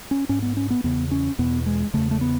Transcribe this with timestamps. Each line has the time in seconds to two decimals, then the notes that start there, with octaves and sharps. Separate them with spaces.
0.11 C#4
0.29 G#2 C#4
0.42 B3
0.57 C#4
0.70 B3
0.84 E2 C#3 B3
1.11 C#4
1.39 E2 B2 B3
1.66 G#3
1.94 E2 C#3 A3
2.11 A3
2.21 B3